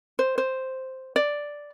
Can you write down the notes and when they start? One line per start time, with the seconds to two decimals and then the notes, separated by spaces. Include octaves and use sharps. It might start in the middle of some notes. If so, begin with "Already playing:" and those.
0.19 C5
0.38 C5
1.16 D5